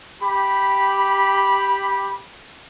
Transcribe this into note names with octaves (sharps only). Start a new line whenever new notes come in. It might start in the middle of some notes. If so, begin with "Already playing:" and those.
G4 B5